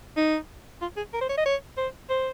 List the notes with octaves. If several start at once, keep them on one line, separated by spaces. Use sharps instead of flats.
D#4
F4
G#4
A#4
C5
C#5
D#5
C#5
C5
C5